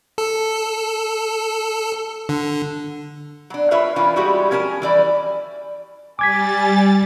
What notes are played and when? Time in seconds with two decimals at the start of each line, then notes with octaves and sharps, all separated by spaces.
0.18 A4
2.29 D3
3.50 F#3 D4
3.71 F4 A#4 B4 C#5 E5
3.96 E3 C#4 D4 F4
4.16 G3 G#3 E4 F#4 G4
4.51 F3 C#4 A#4 G#5 A5
4.82 E3 G3 D5
6.19 G3 G#5 D6 G#6 A6 B6